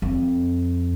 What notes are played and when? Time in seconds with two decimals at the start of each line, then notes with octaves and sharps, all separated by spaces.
0.02 F2